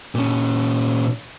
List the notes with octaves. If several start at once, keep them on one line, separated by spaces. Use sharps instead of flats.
A#2 C#4